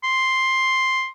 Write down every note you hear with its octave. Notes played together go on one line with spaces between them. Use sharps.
C6